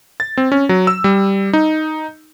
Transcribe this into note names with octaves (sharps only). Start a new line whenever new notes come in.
A6
C4
C#4
F#3
E6
G3
D#4